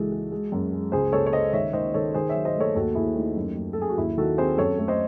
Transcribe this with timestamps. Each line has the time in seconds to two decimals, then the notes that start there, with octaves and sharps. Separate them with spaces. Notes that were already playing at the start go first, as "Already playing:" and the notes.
Already playing: C#2 E3 G#3 F#4 A4
0.12 G#3
0.32 G#3
0.52 F#2
0.72 G#3
0.92 C#2 G#4 C5
1.12 C#2 A4 C#5
1.26 C#5
1.33 C#3 C5 D#5
1.53 D#3 C#5 E5
1.73 D#3 C5 D#5
1.94 D#3 A4 C#5
2.14 D#3 G#4 C5
2.29 C#5 E5
2.35 F#3
2.45 C5 D#5
2.56 A3 A4 C#5
2.75 D#2 F#4 A4
2.95 D#2 E4 G#4
3.16 A3 D#4
3.37 F#2
3.56 F#2
3.73 A4
3.77 F#2 G#4
3.89 F#4
3.98 D#2 E4
4.17 D#3 F#4 A4
4.38 C4 G#4 C5
4.58 F#2 A4 C#5
4.78 A3
4.88 C5 D#5